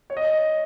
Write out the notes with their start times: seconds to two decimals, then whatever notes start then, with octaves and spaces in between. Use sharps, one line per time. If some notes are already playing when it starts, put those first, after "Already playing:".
0.10 C#5
0.17 D#5